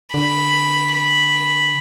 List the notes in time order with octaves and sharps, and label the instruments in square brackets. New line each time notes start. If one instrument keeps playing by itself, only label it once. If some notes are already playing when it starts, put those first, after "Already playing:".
[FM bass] D3 [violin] B5
[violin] B5